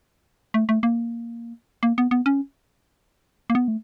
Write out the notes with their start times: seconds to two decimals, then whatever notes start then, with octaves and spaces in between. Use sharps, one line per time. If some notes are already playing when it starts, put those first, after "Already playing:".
0.54 A3
0.69 A3
0.83 A#3
1.83 A#3
1.98 B3
2.11 B3
2.26 C#4
3.50 A#3
3.55 B3
3.68 A3